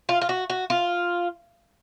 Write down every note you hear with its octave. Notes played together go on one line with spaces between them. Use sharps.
F4
F4
F#4
F#4
F4